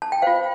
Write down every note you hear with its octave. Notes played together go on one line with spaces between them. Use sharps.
A5
G5
F4 C5 F5